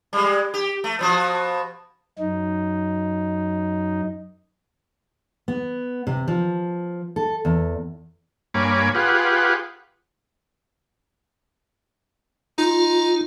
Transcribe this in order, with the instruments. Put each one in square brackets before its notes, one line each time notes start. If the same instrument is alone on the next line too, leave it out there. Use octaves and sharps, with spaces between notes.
[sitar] G3 G#3
G4
A3
B2 F3 F#4
[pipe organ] F#2 D#4
[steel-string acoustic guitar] B3
C3
F3
A4
E2
[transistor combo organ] G2 A#3 C#5 G#5 B5 D6
F4 G4 G#4 B4 F#5
[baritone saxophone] D#4 [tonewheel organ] F4